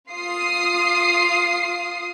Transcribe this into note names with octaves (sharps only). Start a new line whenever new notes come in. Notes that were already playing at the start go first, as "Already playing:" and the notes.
F4 D#6 C7